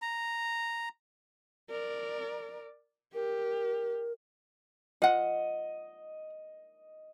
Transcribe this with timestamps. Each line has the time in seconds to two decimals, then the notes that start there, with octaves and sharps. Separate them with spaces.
0.02 A#5
1.70 A#4 D5
3.14 G4 A#4
5.02 F4 D#5 F#5